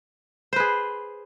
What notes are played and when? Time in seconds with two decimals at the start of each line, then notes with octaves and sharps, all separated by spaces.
0.53 C5
0.56 B4
0.60 G#4